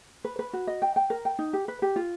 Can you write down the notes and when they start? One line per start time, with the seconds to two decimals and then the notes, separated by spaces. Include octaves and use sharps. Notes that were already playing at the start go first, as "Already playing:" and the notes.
0.25 B4
0.39 B4
0.53 F#4
0.67 D#5
0.82 G5
0.96 G5
1.10 A#4
1.25 G5
1.39 D#4
1.53 G4
1.68 B4
1.82 G4
1.96 F4